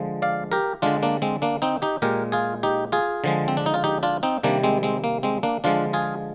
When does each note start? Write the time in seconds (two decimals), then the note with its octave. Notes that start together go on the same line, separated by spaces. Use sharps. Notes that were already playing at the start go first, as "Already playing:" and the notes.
Already playing: D3 F3 G#3
0.22 D5 F5
0.52 G4 A#4
0.82 D3 G#3 D4 F4
1.03 A#3 D4
1.22 G#3 C4
1.42 A#3 D4
1.62 C4 D#4
1.82 D#4 G4
2.02 A#2 G#3 G4 A#4
2.32 F4 G#4
2.63 D#4 G4
2.92 F4 G#4
3.24 D3 F3 G#3
3.48 C4
3.57 D4
3.66 D#4
3.74 F4
3.84 D#4 G4
4.03 D4 F4
4.23 C4 D#4
4.43 C3 D#3 G3 A#3 D4
4.64 G#3 C4
4.83 G#3 C4
5.04 A#3
5.23 G#3 C4
5.43 A#3 D4
5.64 D3 F3 G#3 D4 F4
5.93 F4 G#4